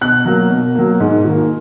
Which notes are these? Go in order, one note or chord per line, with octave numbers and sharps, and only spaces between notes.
B2 F#6
F#3 A#3
B2
F#3 A#3
G#2
D#3 A#3